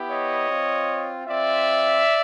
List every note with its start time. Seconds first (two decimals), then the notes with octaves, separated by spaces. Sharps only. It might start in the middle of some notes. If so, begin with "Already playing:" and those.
Already playing: B3 E4 G4
0.10 C#5 D#5
0.49 C4 F4
1.27 C4 F4 D5 E5